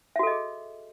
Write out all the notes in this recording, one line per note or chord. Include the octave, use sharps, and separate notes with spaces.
F#4 G#4 A4 D#5 E5